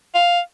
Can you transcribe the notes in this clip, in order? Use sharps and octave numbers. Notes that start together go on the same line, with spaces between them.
F5